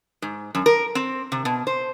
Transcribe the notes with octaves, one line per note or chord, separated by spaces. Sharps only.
G#2
F#2
A#4
C4
C3
B2
C5